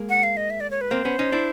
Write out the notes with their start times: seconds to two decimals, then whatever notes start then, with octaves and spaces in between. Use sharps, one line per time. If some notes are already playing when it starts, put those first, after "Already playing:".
Already playing: G#3 A#3
0.09 F#5
0.23 F5
0.37 D#5
0.50 E5
0.60 D5
0.71 C#5
0.81 B4
0.91 A#3 C4 C5
1.05 B3 C#4
1.19 C#4 D#4
1.32 D4 E4